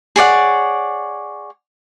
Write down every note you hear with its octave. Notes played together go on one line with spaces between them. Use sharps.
G#4 C#5 D5 F#5